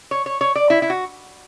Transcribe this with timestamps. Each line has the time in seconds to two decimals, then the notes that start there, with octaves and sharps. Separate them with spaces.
0.11 C#5
0.26 C#5
0.41 C#5
0.55 D5
0.70 E4
0.82 E4
0.90 F#4